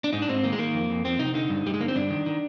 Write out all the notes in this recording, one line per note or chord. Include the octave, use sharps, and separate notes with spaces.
D4
G#2 D#4
D4
G#2 C4
D#3 A#3
G#3
D#3 A#3
F2
F2
F2 C4
C3 D#4
D3 D#4
G2
G2 G3
G#3
D3 A#3
C4
G2 D4
D#3
D#3